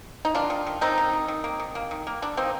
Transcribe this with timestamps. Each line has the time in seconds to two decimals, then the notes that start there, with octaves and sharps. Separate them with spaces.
0.25 D#4
0.35 D#3 D4 F4
0.50 D#3
0.67 D#3
0.81 D#3 C4 D#4
0.98 D#3
1.13 D#3
1.28 D#3
1.44 A#3
1.60 D#3
1.75 A#3
1.91 D#3
2.07 A#3
2.22 D3 D4
2.37 A#3 C4 D#4